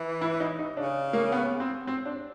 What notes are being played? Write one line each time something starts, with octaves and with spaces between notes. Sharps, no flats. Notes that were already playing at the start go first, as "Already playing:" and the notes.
Already playing: E3
E4
D#4
D#4
C#3 D4
A#3
B3
C4
C4
D4